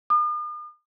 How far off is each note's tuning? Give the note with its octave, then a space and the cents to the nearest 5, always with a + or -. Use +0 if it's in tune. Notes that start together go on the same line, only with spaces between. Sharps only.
D#6 -45